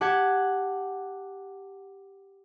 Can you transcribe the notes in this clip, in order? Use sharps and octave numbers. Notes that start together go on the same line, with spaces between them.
G4 F#5 A5 G#6